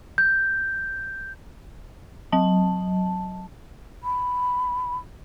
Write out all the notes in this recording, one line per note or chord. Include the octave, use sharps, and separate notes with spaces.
G6
F#3 A5
B5